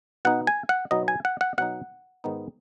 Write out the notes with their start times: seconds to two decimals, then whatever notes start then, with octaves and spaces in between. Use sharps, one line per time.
0.25 B2 B3 D#4 F#5
0.47 G#5
0.69 F#5
0.91 B2 F#3 B3 D#4 D#5
1.08 G#5
1.25 F#5
1.41 F#5
1.58 B2 F#3 D#4 F#5
2.24 G#2 D#3 B3 D#4